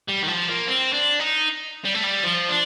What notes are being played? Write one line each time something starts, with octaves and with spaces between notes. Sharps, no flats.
G3
D#3
F3
A#3
C4
D4
D#4
G3
A3
G3
F3
D4